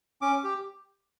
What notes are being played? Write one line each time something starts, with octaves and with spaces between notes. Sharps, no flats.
C#4 D6
G4